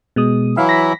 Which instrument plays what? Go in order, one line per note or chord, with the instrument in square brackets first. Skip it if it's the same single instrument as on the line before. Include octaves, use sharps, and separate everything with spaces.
[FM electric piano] B2 G#3 D#6
[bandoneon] E3 F#3 E4 [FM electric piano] E5 F5
[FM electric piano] A#6 B6